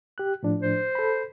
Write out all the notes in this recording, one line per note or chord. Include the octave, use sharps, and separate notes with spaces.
G4 F#6
A2 F3 D4
C5
A4 B5